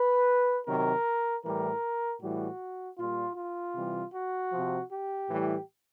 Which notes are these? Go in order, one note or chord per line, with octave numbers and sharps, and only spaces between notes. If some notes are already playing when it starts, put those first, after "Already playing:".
Already playing: B4
C3 D#3 F#3 A#4
A2 E3 G3 A#4
A2 E3 G3 F#4
A#2 G3 F4
F4
C3 E3 G3
F#4
C3 F3
G4
A2 E3 G3